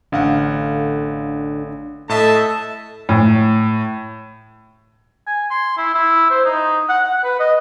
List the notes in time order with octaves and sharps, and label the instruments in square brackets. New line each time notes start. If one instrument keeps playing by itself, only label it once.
[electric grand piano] A1 F5 F#5 [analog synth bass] D3
[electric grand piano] A2 [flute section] A4 [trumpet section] D#5 E5 A5
[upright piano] A2
[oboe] G#5
C6
E4
E4
C5
D#4
F#5
F#5
B4
D#5